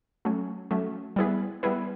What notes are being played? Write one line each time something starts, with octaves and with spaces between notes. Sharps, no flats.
F#3 A3 C#4
F#3 A3 C#4
G3 B3 E4 G#4 B4
G3 B3 E4 G#4 B4